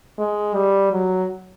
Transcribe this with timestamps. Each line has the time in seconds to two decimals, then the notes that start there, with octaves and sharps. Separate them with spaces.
0.18 G#3
0.54 G3
0.92 F#3